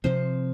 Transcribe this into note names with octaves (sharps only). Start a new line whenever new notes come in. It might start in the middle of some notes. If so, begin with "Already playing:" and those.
C3 F3 C4 C5